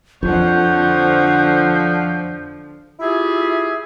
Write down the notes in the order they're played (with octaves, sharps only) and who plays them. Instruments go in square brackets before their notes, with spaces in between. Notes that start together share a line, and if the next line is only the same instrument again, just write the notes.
[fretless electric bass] F2 [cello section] D3 F3 [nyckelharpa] C#5 F#5 [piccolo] G6
[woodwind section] E4 F4 G4 G#4 E5